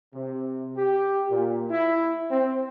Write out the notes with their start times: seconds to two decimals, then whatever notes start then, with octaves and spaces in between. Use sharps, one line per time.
0.14 C3
0.76 G4
1.30 A#2
1.70 E4
2.30 C4